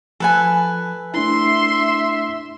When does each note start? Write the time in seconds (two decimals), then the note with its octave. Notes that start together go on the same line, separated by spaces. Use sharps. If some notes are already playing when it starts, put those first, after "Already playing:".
0.20 F3 A4 B4 G#5
1.14 A3 D4 E4 E5 C6